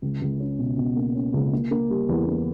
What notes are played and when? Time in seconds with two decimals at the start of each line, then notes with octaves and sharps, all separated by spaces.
0.02 C#2
0.21 C#2
0.40 C#4
0.59 B2
0.78 B2
0.96 A#3
1.15 C#4
1.33 C#2
1.53 A#3
1.71 A#3
1.90 G3
2.09 E2
2.27 A#3